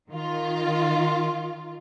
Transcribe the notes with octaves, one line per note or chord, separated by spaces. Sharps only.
D#3 F4